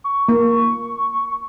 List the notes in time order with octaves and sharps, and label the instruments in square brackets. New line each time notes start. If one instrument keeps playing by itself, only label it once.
[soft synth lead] C#6
[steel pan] A#3